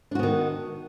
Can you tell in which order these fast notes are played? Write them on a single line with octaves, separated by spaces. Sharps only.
D4 F#4 B3 D#3